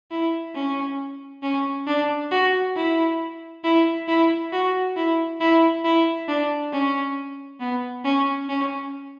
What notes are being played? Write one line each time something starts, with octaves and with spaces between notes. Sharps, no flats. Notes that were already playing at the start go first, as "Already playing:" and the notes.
E4
C#4
C#4
D4
F#4
E4
E4
E4
F#4
E4
E4
E4
D4
C#4
B3
C#4
C#4